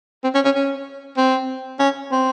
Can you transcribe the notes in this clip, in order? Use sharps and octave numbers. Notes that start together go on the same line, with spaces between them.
C4
C#4
C#4
C#4
C4
C#4
C4